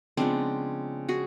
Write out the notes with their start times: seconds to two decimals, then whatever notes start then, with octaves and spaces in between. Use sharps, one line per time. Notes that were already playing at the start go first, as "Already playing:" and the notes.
0.17 C#3 F3 G#3 B3 C4 D4
1.09 F#4 G#4